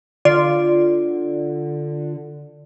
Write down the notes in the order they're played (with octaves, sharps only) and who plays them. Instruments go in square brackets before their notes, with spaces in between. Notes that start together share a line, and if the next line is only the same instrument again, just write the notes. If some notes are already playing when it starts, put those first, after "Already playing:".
[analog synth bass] D3 [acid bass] F4 [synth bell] D5